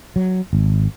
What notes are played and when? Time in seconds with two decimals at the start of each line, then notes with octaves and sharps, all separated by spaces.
0.16 F#3
0.53 G#1